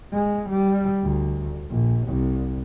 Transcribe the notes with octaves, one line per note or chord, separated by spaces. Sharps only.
G#3
G3
D2
A#1
C2